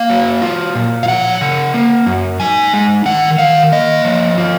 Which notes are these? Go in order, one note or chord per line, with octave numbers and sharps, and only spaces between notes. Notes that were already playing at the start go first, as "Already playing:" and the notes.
Already playing: A#3 F5
F#3
F4
A#2
F5
F3 F#5
C#3
A#3
F#2
D#4 G#5
G#3
D#3 F#5
D#3 F5
A#3 D#5
F3
F4